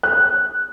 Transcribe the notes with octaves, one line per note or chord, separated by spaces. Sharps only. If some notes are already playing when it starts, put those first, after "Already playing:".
F#6